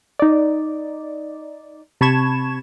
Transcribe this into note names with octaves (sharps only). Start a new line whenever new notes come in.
D#4 D5
C3 A5 B5 C#6 G#6 E7